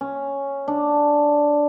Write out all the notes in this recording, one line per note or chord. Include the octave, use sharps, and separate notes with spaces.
C#4
D4